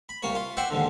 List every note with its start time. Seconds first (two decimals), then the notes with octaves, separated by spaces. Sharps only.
0.09 B5
0.23 C2 A#3 C#5
0.35 F4
0.57 C5 D5 E5 F#5 G5
0.70 D#2 G#2 D3